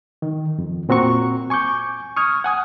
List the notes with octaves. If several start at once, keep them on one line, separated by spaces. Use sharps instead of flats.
D#3
F2
A#2 C4 F#4 A#5 C#6
G#5 C#6 D6 G6
C#6 D#6 F6 G#6
F#5 G#5 D#6